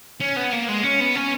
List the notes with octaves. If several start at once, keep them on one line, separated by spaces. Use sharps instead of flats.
C#4
B3
A#3
G#3
C#4
B3
C#4